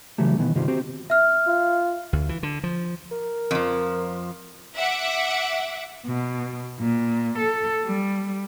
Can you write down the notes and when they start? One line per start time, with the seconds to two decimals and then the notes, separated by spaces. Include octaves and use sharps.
0.18 C#3 E3 F#3 G3 A3
0.38 B2 D#3 E3 B3
0.55 G2 C3 D#3 G3 F4 C5
0.68 C4 F#4 G4 C5
1.10 E5 F6
1.47 F4
2.13 D2
2.29 E3
2.43 D3
2.64 F3
3.12 A#4
3.51 F2 F3
4.76 E5 F#5 D6
6.06 B2
6.80 A#2
7.38 A4
7.85 G3